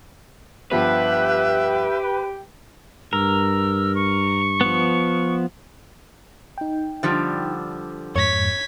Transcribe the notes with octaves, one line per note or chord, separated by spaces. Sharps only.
G2 F3 B3 G4 B4 E5 G5
G2 A#4 E6
C#6
F3 B3
D#4 G5
D3 F3 G3
F2 G#2 C#5 G#6 B6